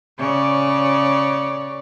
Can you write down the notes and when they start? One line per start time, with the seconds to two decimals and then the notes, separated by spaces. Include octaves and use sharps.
0.19 C#3 C#5 D5